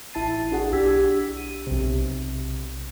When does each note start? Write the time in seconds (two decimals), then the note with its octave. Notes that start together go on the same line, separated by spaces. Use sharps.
0.13 A1 E4 A5 A6 C7 D#7
0.51 D4 F#4 G#4 F#5
0.72 B1 D4 G4 E6 G#6 B6
1.37 D#7
1.67 B1 C3